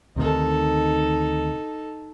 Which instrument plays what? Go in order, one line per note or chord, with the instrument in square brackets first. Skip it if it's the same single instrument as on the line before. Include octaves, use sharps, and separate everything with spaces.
[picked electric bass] D2 C3 D#3 [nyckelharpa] D#4 A4